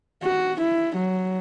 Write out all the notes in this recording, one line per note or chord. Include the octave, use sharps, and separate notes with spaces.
F#4
E4
F#3